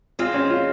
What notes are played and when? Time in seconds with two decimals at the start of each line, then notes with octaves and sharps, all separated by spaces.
0.19 G#3 C4 F4
0.34 C#4
0.50 F4